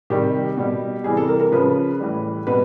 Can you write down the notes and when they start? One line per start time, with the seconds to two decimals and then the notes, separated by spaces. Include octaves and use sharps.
0.10 C3 D#3 G3 G4
0.57 B2 G3
1.04 C3 E3 G3 G#4
1.17 A4
1.28 A#4
1.40 A#4
1.52 C#3 F3 B4
2.00 A2 E3 G3
2.47 B2 G3 B4